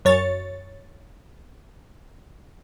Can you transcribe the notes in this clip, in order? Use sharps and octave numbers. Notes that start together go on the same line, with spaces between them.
F#2 C#5 A6